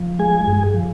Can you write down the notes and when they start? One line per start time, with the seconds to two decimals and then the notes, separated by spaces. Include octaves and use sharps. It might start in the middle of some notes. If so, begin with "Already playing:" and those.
Already playing: F3
0.19 G#3 G#4 G#5
0.47 G2
0.74 F3